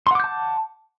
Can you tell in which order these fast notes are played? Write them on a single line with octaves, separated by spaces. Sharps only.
C6 F#5 D6 G6 A5